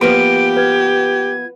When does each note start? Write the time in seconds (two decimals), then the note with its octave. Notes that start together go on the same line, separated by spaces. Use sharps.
0.01 F3 A#3 B3 G4 B4 C6 D7
0.57 B4 G#6